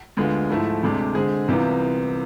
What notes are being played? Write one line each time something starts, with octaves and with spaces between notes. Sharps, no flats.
D2 D3 G#3 B3 F4
G#2 F3 A3 E4
D2 C3 G#3 D4
D3 G#3 C4 G#4
C2 C3 E3 B3 F4